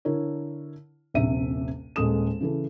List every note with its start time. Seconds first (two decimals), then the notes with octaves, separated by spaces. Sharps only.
0.05 D3 E4 A#4 C#5
1.14 D#1 A#1 C3 E5 D#7
1.96 D#1 G#3 A4 D#6 E7
2.41 C#3 E3 A4